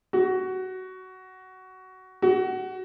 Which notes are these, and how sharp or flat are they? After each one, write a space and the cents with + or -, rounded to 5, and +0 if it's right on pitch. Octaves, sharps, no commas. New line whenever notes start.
F#4 +15
F#4 +20